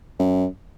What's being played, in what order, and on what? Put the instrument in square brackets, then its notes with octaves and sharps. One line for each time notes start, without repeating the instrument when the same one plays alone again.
[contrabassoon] F#2